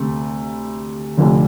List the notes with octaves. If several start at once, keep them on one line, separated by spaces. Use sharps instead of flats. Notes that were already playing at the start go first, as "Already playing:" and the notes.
Already playing: D2 C3 A3
F1 F2 D3